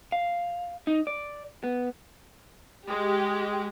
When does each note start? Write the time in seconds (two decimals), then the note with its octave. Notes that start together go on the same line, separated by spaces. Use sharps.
0.12 F5
0.87 D#4
1.07 D5
1.64 B3
2.89 G#3 G4